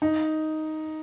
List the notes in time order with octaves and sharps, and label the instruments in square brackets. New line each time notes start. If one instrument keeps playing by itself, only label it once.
[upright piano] D#4